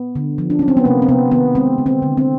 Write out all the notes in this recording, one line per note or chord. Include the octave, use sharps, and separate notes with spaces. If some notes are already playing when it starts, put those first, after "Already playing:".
Already playing: B3
D3
F3
D4
F#3 C#4
C4
B3
C3 A#3
C4
C3 B3
D#3 B3
G#3 C4
D3
C4
D3
C4